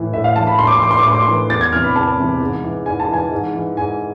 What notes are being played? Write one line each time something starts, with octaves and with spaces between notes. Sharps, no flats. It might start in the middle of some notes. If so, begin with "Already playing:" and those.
Already playing: A2 E3
A2 E5
F5
E3 A5
B5
A2 C6
D6
C6
E3 D6
C6
D6
A2 C6
D6
C6
E3
E2 A6
G#6
C3 E3 F6
B5
E2 A5
C3 E3
G#2
E3
G#2 G#5
A5
E3 G#5
G#2
E3
G#2 G#5